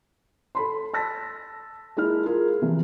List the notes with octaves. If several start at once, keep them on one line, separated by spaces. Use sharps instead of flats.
A4 B5 C6
A5 E6 A#6 B6
G#3 A#3 E4 F6
F4 G#4 A#4
C3 E3 F3